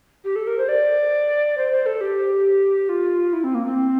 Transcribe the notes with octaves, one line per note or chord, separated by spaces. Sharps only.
G4
A4
A#4
C5
D5
C5
C5
A4
G4
F4
E4
C4
A#3
C4